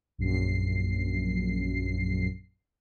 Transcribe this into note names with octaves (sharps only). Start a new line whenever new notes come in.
A#1 F#2 C7